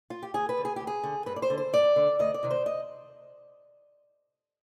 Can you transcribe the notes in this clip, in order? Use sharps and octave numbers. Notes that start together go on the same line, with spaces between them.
F4
G4
D2 G#4
B4
D3
G#4
D2 G4
G#4
D3
G2 B4
D5
C5
D3
C5
G2 D5
D3
D2 D#5
D5
C3 D#3
C5
D#5